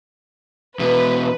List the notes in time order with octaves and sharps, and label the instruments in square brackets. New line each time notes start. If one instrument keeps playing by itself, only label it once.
[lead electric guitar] E2 B2 [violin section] B4